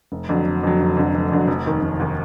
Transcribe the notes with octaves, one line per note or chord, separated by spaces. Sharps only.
F1
F2 D3 F#3
F1
F2 D3 F#3
F1
F2 D3 F#3
F1
F2 D3 F#3
F1
D#2 D#3
F1
D#2 D#3